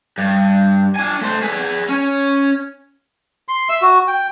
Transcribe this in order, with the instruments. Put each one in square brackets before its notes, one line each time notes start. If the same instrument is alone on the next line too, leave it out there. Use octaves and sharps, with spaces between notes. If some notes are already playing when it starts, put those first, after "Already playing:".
[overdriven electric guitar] G2
D4 G#5
A3 C5
G#4 B4
C#4
[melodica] C6
E5
F#4
G5